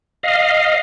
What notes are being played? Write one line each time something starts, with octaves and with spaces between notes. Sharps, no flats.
D#5 F5